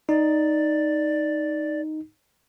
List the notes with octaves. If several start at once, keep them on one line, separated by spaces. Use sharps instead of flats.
D#4 D5